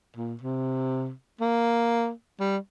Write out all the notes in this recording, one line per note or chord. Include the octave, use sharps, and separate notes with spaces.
A#2
C3
A#3
G3